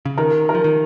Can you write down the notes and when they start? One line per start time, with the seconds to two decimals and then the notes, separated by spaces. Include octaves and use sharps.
0.05 C#3
0.17 D#3 A#4
0.49 A#4
0.55 F3
0.64 D#3